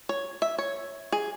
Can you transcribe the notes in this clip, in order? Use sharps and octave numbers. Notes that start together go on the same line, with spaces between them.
C#5
E5
C#5
G#4